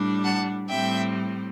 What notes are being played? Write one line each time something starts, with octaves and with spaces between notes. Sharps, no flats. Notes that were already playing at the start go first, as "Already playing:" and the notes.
Already playing: A2 G3 D4
F#5 A5
A2 G3 C4 E5 G5